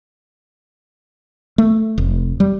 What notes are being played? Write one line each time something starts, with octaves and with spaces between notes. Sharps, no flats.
A3
F1
G3